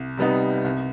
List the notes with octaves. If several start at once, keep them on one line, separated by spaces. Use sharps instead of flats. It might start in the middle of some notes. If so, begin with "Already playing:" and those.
Already playing: C2
C3 G3 B3 D#4
C2